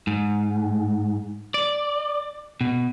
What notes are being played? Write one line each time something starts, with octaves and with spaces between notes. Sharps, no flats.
G#2
D5
B2